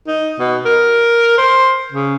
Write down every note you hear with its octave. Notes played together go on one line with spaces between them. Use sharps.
D#4
B2
A#4
C5
C#3